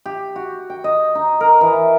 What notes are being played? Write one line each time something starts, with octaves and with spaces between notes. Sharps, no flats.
G4
F#4
G5
D#5
D#4
A#4
E3